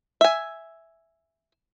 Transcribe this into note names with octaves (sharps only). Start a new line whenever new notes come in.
E5 G#5